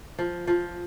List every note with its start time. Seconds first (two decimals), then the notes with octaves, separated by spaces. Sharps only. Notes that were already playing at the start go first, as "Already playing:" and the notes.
0.19 F3
0.47 F3